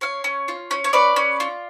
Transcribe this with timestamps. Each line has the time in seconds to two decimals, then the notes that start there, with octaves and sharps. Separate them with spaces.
0.01 C#4 C#5 F5
0.24 C#4
0.48 F4
0.71 C#4
0.84 C#5
0.93 C#4 B4 D5
1.16 C#4
1.40 F4